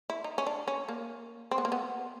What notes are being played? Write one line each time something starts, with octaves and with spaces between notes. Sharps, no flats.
E4
D#4
C#4
D4
C#4
A#3
C4
B3
A#3
B3